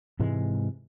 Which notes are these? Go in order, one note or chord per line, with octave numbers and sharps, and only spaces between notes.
G#2 C3 E3 G#3